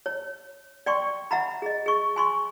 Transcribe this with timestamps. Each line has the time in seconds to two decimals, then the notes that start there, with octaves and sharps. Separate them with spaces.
0.06 C#5
0.86 D5 G5 C6 C#6
1.31 E5 F#5 A#5 B5
1.62 G#4 D#5
1.86 G#4 C#6
2.16 G#5 C6 C#6